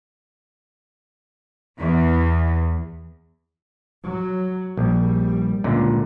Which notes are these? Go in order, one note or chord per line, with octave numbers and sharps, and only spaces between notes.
E2
F#3
A#1 G3
C#2 A#2 D3